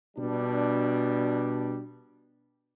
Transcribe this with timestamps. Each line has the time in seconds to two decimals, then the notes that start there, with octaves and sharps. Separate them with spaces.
0.17 B2 G3 D4